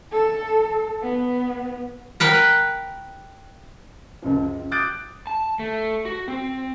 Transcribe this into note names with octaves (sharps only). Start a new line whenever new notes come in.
A4
B3
A#4 B4 F#5 G5
C#2 F#2 F3
D6 D#6 F#6 G6 A6 D7
A5
A3
F#4
C4